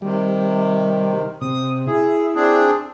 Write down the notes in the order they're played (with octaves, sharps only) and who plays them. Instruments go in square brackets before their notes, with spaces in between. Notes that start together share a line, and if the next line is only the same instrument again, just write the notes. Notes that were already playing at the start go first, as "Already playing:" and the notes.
[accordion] C3 D#3 [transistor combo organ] G3
[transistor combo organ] C3 [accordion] D#6
[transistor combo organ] E4 [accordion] G#4
[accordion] C4 D4 G#4